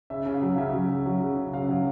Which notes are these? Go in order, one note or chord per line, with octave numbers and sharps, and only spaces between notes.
C#3 E5
C#3
F5
F#3
C#3 E5
F#3
C#3
F#3
C#3
C#3
C#3 F5
F#3